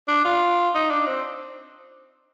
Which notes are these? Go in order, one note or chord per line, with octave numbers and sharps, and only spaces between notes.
D4
F4
D#4
D4
C4